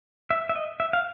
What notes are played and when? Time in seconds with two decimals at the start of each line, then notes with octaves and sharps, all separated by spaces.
0.30 E5
0.49 E5
0.55 D#5
0.80 E5
0.93 F5